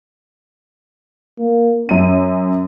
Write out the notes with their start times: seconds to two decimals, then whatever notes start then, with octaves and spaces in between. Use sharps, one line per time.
1.39 A#3
1.89 F#2 C#4 D#7